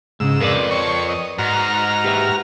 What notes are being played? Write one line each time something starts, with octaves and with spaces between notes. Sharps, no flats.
C#2 G#2 C#3 E6
F2 A#4 B4 D5
C#5 C#6
D#5
G#2 F#4 A#5 F6
G4 B4 E5